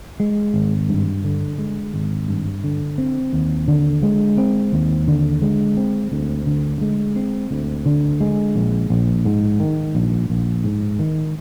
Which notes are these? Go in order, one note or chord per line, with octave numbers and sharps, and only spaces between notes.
G#3
G#1
G2
D3
G#3
G#1
G2
D3
C4
D#2
D3
G#3
C4
D#2
D3
G#3
C4
D2
D3
G#3
C4
D2
D3
G#3
A#1
A#1
G#2
D#3
A#1
A#1
G#2
D#3